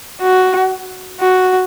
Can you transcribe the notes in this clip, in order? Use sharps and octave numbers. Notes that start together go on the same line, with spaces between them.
F#4
F#4